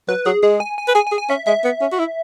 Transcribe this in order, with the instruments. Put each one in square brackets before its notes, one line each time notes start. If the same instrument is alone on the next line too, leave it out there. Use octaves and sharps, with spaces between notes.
[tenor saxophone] F#3 [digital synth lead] B4
[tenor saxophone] F#3 [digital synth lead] G#4
[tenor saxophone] G#3 [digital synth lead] G#4
[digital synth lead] G#5
G#5
[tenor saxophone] B4
[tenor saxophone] G#4 [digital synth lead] G#5
[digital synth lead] G#5
[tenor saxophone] G#4
[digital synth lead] G#5
[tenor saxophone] C#4 [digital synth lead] E5
[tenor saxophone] G#3 [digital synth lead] E5
[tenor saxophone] B3
C#4
F#4
E4